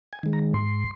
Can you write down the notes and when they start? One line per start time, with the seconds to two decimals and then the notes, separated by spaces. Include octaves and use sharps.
0.13 G#5
0.23 D#3 G#3
0.33 A#5
0.53 G#2 C6